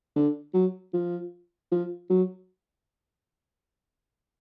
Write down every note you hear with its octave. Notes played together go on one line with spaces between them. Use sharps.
D3
F#3
F3
F3
F#3